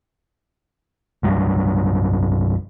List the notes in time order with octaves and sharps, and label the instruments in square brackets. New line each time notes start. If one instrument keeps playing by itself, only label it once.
[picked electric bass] C2 G2 F#3 G3